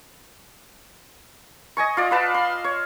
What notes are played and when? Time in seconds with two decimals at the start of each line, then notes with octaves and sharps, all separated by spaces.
1.77 D#5 G#5 C#6
1.97 F4 D5 D#5
2.11 F4 B4 A5
2.34 C6
2.64 C#5